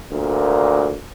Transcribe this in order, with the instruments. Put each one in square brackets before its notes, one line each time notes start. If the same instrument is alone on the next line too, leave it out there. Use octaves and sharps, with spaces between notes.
[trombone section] D2 A#2